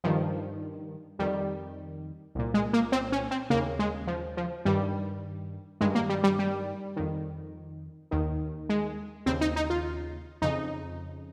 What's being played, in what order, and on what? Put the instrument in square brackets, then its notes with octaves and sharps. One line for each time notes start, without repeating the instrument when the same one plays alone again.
[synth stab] G2 D#3 F3
F2 D#3 G3
C2 A#2
G#3
A#3
C4
C#4
C4
D#2 C#3 A#3
G#3
F3
F3
G2 D#3 G3
G2 D#3 G#3
A#3
G3
G3
G3
F2 D#3
D#2 D#3
G#3
D#2 C#3 C4
D#4
D#4
F4
F2 C#3 D#4